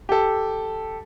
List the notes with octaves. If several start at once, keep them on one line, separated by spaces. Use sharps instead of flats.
G4 A4